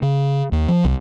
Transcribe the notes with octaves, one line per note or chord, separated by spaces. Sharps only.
C#3
D#2
F3
C2